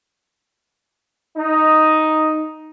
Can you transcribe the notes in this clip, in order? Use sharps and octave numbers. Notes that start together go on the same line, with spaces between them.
D#4